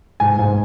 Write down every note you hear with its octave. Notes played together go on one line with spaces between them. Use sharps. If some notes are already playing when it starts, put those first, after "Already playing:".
G#2 G#5
G#2